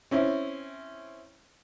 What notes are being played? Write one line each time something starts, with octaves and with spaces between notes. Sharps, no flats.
C4 C#4 E4